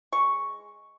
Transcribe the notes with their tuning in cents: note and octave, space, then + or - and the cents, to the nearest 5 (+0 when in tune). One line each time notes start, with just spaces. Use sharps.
G#3 +0 C#6 +0